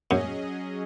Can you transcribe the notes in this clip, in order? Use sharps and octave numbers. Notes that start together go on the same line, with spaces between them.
F#2 F#3 C#4 G#4 D#5